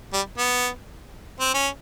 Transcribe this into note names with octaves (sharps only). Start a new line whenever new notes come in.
G3
B3
C4
C#4